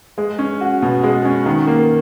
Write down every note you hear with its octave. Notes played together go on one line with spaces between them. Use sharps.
G#3
C#4
F#4
B2
G#3
C#4
D#3
A#3